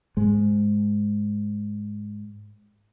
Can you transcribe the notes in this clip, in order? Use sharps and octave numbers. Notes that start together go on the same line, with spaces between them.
G#2 G#3